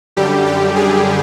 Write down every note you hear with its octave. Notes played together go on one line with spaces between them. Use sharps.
F#2 D3 G3 G4
G4
G#4